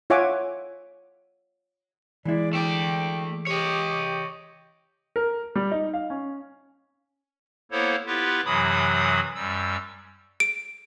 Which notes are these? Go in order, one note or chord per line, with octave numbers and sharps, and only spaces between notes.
F4 C#5 E5 F#5 G#5 D6
E3 G#3 E4 D5
A3 D5 G5
G4 C#5 D#5
A#4
G3
D#4
F5
C#4
A#3 B3 E4 A4 C5 C#5
B3 E4 F4 G4 B4
F#2 C3 E3 F#3 B5 D#6
F#2 G3 E6
D7